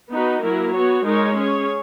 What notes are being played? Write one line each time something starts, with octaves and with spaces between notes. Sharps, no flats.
B3 D#4 F#4 B4
F#3 A#3 E4 A#4
B3 F#4 C#5
G#3 D#4 A#4 C#5
C#4 G#4 C#5